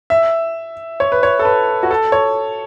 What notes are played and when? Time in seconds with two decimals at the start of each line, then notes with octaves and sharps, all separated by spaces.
0.10 E5
1.00 C#5
1.12 B4
1.23 C#5
1.39 A4
1.45 B4
1.83 F#4
1.91 A4
2.12 C#5